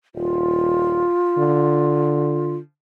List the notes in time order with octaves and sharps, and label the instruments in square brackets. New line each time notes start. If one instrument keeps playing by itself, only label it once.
[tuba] D#1 [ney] F4
[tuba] D3